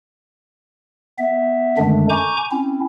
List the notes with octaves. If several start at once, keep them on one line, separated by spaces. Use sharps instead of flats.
B3 E5
F#2 D3 D#3 G#3 A3 D4
G#5 A#5 C#6 D6 G6
C4 C#4 E4